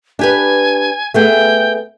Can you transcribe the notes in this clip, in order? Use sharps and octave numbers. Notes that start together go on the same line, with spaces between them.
D4 G4 B4 G#5
A3 B3 G#4 G5